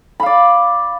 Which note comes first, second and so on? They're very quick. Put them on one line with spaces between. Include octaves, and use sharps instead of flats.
B5 F5 D5